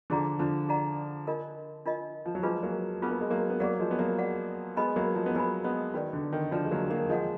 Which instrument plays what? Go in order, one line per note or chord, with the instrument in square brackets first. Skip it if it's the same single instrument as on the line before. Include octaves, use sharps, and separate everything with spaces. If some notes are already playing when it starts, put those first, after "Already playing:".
[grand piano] D3 F3 [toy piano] D#4 G#4 D5 F#5 A#5
[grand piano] D3 F3
[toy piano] D#4 G#4 D5 F#5 A#5
D4 F4 A#4 D#5
D4 F4 A#4 D#5
[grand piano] F3
F#3
[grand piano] F3 G#3 [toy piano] D4 F4 G#4 B4
[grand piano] F#3 A#3
[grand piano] B3 [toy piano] D4 F4 G#4 B4
[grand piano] A#3
G#3
F#3 A#3
B3
[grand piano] F#3 A#3 [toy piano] G#4 D5 F#5
[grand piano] F3 G#3
B3
F#3 A#3
[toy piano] G#4 D5 F#5
[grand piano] G#3 B3 [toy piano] B4 D#5 G#5 B5
[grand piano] F#3 A#3
F3 G#3
B3
[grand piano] F#3 A#3 [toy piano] B4 D#5 G#5 B5
[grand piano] G#3 B3
[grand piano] D#3 [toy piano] F#4 B4 D5
[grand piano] D3
D#3
[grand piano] D3 F3 [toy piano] F#4 B4 D5
[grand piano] G#3
F#3 A#3
F#3 A#3
[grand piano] F3 G#3 [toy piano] A#4 D#5 F#5